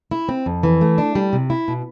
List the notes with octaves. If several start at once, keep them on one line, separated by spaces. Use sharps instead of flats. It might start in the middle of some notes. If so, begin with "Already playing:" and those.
E4
C4
F2
E3
A3
D4
G3
C3
E4
B2